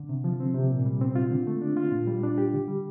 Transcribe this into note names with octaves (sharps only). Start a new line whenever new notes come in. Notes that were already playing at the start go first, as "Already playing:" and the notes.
Already playing: D3
C3
F3
C4
C3
A#2
G3
C4
F4
D3
A3
D4
F4
A#2
G3
D4
G4
D3
G3